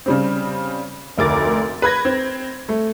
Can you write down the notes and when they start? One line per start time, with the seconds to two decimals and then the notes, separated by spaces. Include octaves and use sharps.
0.06 C#3 G3 C4
1.18 F1 D2 A#4 D6 A6
1.82 B4 B5 G#6 A#6
2.05 C4
2.69 A3